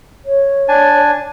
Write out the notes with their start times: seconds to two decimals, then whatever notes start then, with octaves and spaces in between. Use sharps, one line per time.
0.25 C#5
0.68 D4 G#5 A5